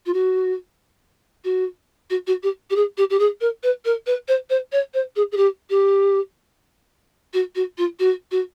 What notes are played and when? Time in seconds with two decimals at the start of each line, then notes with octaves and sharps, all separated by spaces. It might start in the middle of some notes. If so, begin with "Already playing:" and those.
0.06 F4
0.13 F#4
1.44 F#4
2.10 F#4
2.27 F#4
2.43 G4
2.70 G4
2.76 G#4
2.97 G4
3.10 G4
3.19 G#4
3.41 A#4
3.63 B4
3.85 A#4
4.06 B4
4.28 C5
4.50 C5
4.72 C#5
4.94 C5
5.16 G#4
5.32 G#4
5.37 G4
5.70 G4
7.33 F#4
7.55 F#4
7.78 F4
7.99 F#4
8.31 F#4